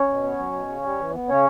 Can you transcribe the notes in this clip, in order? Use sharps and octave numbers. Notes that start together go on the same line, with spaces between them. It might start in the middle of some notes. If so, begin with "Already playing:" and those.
Already playing: C#4 C#5
B2
B3
F#3
B2
C#3
G3
E3
B3
C#3 C#4 C#5